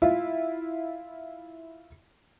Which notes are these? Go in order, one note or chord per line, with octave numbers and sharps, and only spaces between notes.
E4 F4